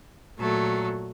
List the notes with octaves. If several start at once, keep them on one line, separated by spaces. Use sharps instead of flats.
A#2 F#3 A3